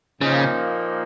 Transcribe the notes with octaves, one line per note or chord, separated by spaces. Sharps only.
A#2 C#3 F3 A#3 D#4